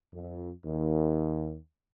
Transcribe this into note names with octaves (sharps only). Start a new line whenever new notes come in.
F2
D#2